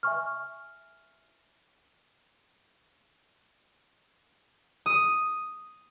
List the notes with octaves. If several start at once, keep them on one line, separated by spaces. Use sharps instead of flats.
E5 G#5 C#6 F6
D#6